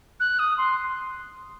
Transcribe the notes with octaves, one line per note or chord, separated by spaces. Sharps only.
F#6
D#6
C6